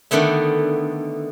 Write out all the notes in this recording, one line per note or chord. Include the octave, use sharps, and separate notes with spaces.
D3 D#3 A3 B3 E5